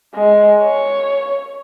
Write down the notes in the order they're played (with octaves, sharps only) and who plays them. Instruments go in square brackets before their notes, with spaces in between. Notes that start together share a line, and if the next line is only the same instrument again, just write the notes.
[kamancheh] G#3
C#5